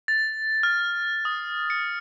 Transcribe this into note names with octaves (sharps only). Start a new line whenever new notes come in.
A6
F6
D#6
C#7